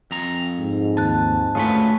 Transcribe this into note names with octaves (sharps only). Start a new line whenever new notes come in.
F2 A#5
G#2
D#2 A5 F#6 A6
D2 A3 C#4 F4 G#4 B4